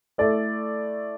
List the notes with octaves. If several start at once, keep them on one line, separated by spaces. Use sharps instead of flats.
A3 E4 A4 D5